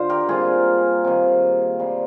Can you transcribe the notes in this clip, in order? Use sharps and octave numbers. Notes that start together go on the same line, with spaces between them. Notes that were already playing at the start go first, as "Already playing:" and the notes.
Already playing: D3 F4 C5
G4 A#4
C3 G3 A#3 F4 G#4
C3 D#3 A#3
C3 G3 A#3